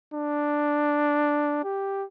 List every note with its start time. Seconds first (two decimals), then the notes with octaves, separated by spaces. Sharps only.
0.14 D4
1.64 G4